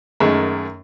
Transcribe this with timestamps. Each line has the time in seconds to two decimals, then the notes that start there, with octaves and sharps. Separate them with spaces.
0.20 F#2 D#3 G#3 A3